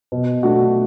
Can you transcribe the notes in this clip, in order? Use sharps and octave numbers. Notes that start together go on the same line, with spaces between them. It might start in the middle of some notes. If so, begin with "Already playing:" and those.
B2
A3 D4 F#4